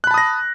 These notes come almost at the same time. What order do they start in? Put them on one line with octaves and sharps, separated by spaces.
F#6 B5 A5 D#6 A#6